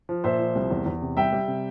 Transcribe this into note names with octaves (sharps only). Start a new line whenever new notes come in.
F3
A#2 C5 E5
F3
C2
E2
E2
C3
G3 E5 G5
G3
C3